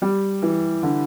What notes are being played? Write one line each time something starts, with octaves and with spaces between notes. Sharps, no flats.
G3
E3
D3